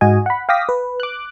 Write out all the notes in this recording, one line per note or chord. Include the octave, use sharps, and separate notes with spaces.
G#2 F#4 D#5 G#5
F#5 B5
F5 G5 D6 D#6 A#6 B6
B4
D6 F#6